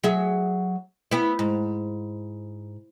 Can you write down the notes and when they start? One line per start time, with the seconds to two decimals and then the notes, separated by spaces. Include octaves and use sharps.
0.04 F#3 G#4 E5
1.11 B3 E4
1.39 G#2